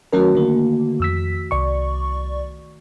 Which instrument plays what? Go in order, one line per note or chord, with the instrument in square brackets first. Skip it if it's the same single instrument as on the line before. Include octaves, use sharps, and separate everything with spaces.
[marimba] D#3 A3 F#4 [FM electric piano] F#3 C#4 A#4
[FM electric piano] D3 A#3
F2 E6 B6
C2 D5 C#6